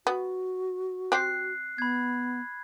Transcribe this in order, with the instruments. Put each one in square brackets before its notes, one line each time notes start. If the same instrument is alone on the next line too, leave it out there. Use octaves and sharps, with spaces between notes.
[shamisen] B3 [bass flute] F#4
[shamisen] C4 G4 [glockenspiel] F#6 C7
[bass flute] B3 [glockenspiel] B5 G#6